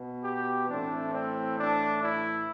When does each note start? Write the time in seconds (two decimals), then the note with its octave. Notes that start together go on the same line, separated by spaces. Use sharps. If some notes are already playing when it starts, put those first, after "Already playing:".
Already playing: B2 B3
0.23 G4
0.68 A2 E3 A3 C4 D4
1.12 C4
1.57 D4
2.02 E4